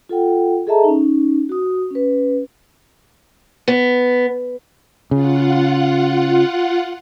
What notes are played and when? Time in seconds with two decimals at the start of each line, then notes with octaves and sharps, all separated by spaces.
0.09 F4 A4 F#5 G5
0.67 G#4 A4 D#5 E5 A5 A#5
0.84 C#4 D#4
1.49 F#4 D#6
1.91 C#4 B4
3.68 B3
5.11 C#3 F4 F#5